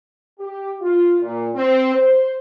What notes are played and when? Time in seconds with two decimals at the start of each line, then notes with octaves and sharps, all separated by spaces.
0.39 G4
0.81 F4
1.21 A#2
1.55 C4
1.94 C5